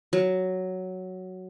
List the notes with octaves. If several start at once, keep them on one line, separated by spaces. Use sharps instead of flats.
F#3